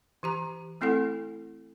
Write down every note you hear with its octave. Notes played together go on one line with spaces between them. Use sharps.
E3 G4 A#5
A3 C4 E4 A4 F#5